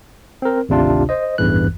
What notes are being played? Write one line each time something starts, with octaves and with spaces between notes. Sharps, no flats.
C4 A#4
G#1 D2 C3 D4 F4
C5 D#5
A1 E2 G2 E3 F#6